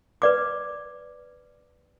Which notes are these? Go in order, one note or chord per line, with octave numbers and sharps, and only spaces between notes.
B4 D5 D6